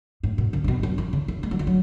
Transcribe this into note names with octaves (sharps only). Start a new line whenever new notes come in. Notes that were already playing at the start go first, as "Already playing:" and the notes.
A2
B2
C#3
C#3
B2
F#2
E3
C#3
E3
G#3
F#3
E3
F#3